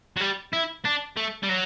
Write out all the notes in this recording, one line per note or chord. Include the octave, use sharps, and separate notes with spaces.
F#3
G3
E4
D4
A3
G3
F#3